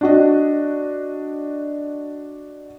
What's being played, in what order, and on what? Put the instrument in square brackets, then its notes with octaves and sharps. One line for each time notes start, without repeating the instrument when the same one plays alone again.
[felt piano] D4 F#4 D#5